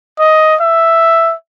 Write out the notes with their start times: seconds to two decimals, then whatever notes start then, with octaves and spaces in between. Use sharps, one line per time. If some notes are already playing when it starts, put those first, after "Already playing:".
0.19 D#5
0.61 E5